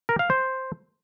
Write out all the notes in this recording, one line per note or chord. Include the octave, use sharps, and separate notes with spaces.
A#4
F5
C5